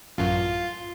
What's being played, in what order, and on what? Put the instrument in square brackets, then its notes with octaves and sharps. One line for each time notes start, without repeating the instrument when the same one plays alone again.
[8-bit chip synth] A1 F#2 [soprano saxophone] F4